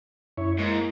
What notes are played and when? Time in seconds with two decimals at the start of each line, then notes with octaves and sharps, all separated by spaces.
0.38 F#2 E4 C#5
0.58 G#2 A#3 E4